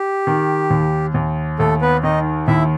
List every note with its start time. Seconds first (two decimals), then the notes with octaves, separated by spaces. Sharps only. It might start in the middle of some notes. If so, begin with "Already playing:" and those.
Already playing: G4
0.27 D#3
0.70 D#2
1.14 D#2
1.59 D#2 A3 A4
1.81 B3 B4
2.03 D#3 D#4 D#5
2.48 D#2 E4 E5